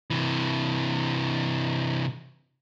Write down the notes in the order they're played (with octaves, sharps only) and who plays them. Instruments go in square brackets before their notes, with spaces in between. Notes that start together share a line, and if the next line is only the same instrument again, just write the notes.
[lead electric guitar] C3 E3